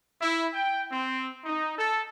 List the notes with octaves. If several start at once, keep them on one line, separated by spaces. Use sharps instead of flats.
E4
G5
C4
D#4
A4